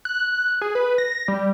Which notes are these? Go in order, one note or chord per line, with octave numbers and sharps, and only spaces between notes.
F#6
G#4
B4
A#6
G3